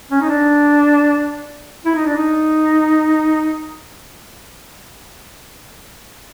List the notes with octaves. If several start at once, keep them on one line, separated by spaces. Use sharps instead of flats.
C#4
D#4
D4
E4
D#4
D4
D#4